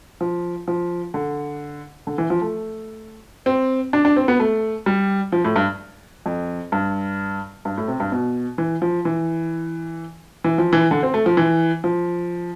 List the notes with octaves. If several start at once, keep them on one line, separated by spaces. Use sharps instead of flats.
F3
F3
D3
D3
E3
F3
A3
C4
D4
D4
C4
B3
A3
G3
F3
A2
G2
F2
G2
G2
A2
C3
G2
B2
E3
F3
E3
E3
F3
E3
D3
C4
A3
F3
E3
F3